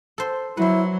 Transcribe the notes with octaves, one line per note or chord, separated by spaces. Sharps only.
A4 C5
F#3 E4 B4 C5